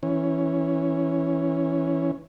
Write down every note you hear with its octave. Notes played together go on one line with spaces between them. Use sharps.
E3 C#4